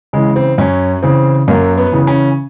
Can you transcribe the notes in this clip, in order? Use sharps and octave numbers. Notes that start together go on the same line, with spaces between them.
C#3 E3 G#3
C4
F#2 C#4
C#3 E3 C4
F#2 A#3
B3
C#3 E3
C#4